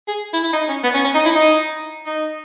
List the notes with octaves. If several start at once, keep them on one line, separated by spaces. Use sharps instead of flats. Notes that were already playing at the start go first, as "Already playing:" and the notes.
G#4
E4
E4
D#4
C#4
B3
C#4
C#4
D#4
E4
D#4
D#4